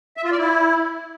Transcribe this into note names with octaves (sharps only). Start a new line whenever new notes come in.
E5
F4
D5
E4